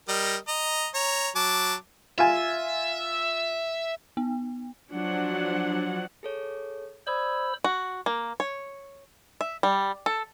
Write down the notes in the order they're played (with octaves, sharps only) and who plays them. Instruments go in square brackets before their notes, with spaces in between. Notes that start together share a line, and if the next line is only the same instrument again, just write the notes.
[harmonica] G3 A#4 D#5
D#5 A#5
C#5 A#5
F#3 A5 D6
[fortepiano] F4 G#5 [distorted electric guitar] E5
[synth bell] B3
[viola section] F3 F#3 D4 F#5
[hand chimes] G#4 A4 C#5
[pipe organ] C5 B5 E6 [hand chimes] D5 D#6 G#6
[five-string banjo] F#4
A#3
C#5
E5
G3
A4